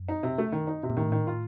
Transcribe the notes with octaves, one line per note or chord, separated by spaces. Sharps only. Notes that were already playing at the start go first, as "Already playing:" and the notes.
Already playing: F#2
D#4
C3
A3
D#3
D#4
C3
A#2
A2 D#3
D#3
F4